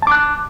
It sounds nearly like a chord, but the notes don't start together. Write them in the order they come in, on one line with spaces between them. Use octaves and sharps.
A5 D6 F#6